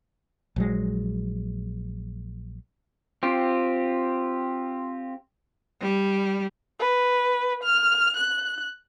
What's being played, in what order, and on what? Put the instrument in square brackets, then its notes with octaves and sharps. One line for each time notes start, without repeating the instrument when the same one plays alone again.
[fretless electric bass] A#1 F#3 G#3
[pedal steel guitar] C4 F4 G4
[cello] G3
[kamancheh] B4
F6
F#6